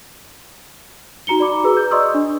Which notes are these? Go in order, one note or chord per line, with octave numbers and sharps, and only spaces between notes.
D#4 F#4 A#5 C#7 G7
D5 B5 D6
F#4 G#4 B4 A#5 E6
G6
D5 D#5 C6 C#6 D#6 E6
D4